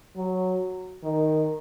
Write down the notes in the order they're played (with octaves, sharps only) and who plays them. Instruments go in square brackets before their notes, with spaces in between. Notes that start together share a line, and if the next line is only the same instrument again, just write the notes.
[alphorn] F#3
D#3